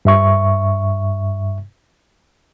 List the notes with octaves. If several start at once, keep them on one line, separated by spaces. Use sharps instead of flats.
G2 E5 C#6